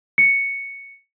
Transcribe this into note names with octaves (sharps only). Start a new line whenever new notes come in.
C#7